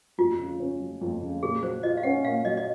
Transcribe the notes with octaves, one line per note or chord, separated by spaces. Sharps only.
F2 F4
C#3
C#4
F#3
F2
C#3
A#2 G#4
F#3 C5
F4 D#5
F5
C#4 F#5
A#2 F5
F#3 D#5
D#5